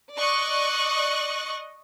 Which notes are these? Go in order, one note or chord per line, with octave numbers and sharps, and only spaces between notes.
D5 D#5 C#6 F#6